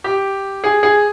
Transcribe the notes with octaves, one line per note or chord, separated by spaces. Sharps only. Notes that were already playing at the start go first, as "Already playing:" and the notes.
G4
G#4
G#4